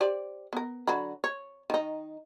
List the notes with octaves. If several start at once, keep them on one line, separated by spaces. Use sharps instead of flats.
G4 C5 D5
B3 A#4
D3 F#3 B5
C#5
D#3 D#4